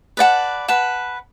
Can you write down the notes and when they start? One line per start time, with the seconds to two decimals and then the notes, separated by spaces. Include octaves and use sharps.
0.17 B4 D5 F#5 A5
0.68 B4 F#5 A5